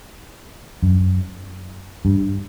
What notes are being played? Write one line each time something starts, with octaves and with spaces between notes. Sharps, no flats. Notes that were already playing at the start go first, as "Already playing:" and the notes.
F#2
G2